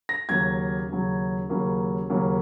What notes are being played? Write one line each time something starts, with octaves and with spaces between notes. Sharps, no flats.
A#6
D#2 C#3 F#3 G#6
D#2 C#3 F#3
D#2 C#3 F#3 A#3
D#2 C#3 F#3 A#3